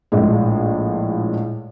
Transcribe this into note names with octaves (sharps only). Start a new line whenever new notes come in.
A#1 A2 G#3